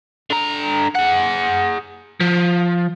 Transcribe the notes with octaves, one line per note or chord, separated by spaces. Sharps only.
D3 A#5
G#4 F#5
F3